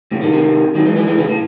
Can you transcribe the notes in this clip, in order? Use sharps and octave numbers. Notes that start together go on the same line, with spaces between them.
A2 C#3
C3 D#3
C3 D#3
D#3 F#3
E3 G#3
E3 G#3
E3 G#3
C#3 E3
A2